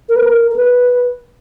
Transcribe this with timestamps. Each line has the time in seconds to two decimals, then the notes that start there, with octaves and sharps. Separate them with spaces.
0.09 A#4
0.16 B4
0.24 A#4
0.51 A#4
0.56 B4